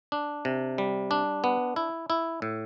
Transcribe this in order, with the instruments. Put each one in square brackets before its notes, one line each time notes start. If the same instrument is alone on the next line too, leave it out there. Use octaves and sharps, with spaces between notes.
[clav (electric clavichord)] D4
C3
G3
D4
B3
E4
E4
A2